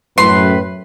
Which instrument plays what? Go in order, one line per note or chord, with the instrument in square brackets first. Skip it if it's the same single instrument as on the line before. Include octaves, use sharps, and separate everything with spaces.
[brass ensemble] F#2 A2 B4 [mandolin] C6